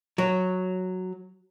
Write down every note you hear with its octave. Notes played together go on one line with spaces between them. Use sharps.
F#3